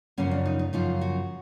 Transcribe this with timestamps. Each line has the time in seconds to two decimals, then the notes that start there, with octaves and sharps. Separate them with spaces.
0.17 F#2 C#3 F3 A#3 C#4
0.31 D4
0.45 D#4
0.59 D#4
0.73 F#2 C#3 F3 A#3 F4
1.01 F#4